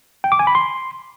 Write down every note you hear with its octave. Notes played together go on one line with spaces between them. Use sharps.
G5
D6
G#5
B5
C6